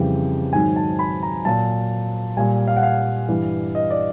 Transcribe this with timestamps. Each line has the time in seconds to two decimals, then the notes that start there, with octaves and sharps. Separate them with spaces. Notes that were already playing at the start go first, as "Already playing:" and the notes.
Already playing: F2 C#3 E3 G3 G5
0.53 G#2 D#3 F#3 G#5
0.76 A5
0.99 B5
1.23 A#5
1.45 A#2 F#3 A5
2.37 A#2 G3 G#5
2.68 F5
2.77 F#5
2.83 F5
3.29 G2 E3 G3
3.75 D#5
3.90 D5